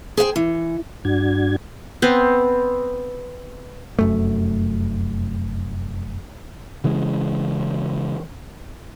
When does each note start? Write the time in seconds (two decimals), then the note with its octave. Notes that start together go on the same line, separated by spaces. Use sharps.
0.17 G#4 C5 F5 G5
0.36 E3
1.05 G2 D4 F#4 G#6
2.02 B3 C4
3.99 F1 F#2 A3
6.84 C#3 E3 G#3